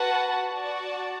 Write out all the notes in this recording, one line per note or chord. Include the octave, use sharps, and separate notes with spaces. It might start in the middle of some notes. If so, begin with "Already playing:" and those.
Already playing: F#4 B4 F#5 A5
F#4 D5 F#5 A5